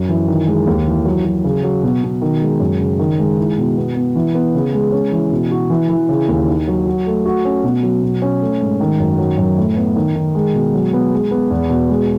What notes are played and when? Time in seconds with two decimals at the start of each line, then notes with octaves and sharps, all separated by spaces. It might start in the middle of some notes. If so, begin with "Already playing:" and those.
Already playing: F#2
0.09 E3
0.28 D#3
0.47 G#3
0.67 D#2
0.87 E3
1.05 F#3
1.25 F#3
1.44 C#3
1.63 F#3
1.83 B2
2.03 B2
2.21 D#3
2.41 G#3
2.60 F#2
2.79 C#3
2.99 D#3
3.19 G#3
3.38 E4
3.58 B2
3.77 B3
3.96 B3
4.15 E3
4.34 B3
4.55 C#3
4.74 G#3
4.92 C#4
5.12 E3
5.32 B2
5.51 F#4
5.70 E3
5.89 E3
6.09 C#3
6.29 D#2
6.47 D#4
6.67 F#3
6.86 F#4
7.06 A3
7.25 F#4
7.45 C#4
7.64 B2
7.83 F#3
8.03 B2
8.22 C#4
8.42 A3
8.61 G#2
8.80 D#3
8.99 F#2
9.18 F#3
9.38 F#2
9.58 A2
9.76 B3
9.96 D#3
10.15 D#3
10.35 G#3
10.54 B2
10.74 F#3
10.93 B3
11.12 G#3
11.31 B3
11.50 E2
11.70 B2
11.89 G#3